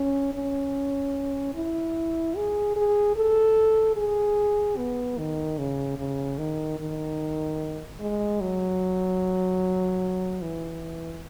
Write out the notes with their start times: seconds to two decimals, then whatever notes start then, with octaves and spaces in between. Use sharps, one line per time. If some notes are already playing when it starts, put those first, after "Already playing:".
Already playing: C#4
0.34 C#4
1.54 E4
2.36 G#4
2.76 G#4
3.16 A4
3.96 G#4
4.77 B3
5.18 D#3
5.59 C#3
5.98 C#3
6.38 D#3
6.78 D#3
8.00 G#3
8.41 F#3
10.42 E3